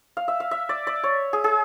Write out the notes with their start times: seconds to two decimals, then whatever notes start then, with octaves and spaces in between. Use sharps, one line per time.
0.17 F5
0.28 E5
0.40 F5
0.51 E5
0.69 D5
0.87 D5
1.03 C#5
1.33 G#4
1.44 G#4